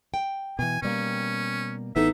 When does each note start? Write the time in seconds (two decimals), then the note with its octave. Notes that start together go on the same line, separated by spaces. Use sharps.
0.14 G5
0.59 B2 E3 G#5
0.82 B2 G3 A#3 C#4
1.96 A1 E3 B3 D#4 A4 E5